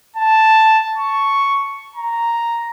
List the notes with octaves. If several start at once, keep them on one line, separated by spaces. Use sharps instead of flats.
A5
C#6
A#5